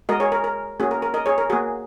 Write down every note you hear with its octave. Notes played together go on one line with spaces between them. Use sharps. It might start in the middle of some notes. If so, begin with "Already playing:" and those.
G#3 F#4 A#4 D#5
G#4 C#5
A#4
A#4
A#3 C#4 F#4 G#4
A#4
A#4
A#4 D#5
G#4 C#5
A#4
A#3 F#4 G#4